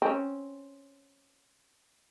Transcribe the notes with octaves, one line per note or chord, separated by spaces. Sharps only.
C4 C#4